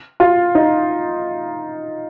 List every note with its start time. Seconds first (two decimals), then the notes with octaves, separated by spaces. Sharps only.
0.20 F4
0.55 D#4